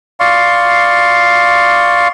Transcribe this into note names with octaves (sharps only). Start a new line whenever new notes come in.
D5 F5 C6 C#6